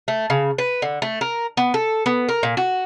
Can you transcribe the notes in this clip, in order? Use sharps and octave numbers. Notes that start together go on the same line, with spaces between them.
A3
C#3
B4
D3
A3
A#4
B3
A4
B3
A#4
A#2
F#4